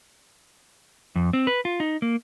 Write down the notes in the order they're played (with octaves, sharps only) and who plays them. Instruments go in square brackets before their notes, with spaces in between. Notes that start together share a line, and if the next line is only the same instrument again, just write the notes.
[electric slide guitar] F2
C4
B4
F4
D#4
A#3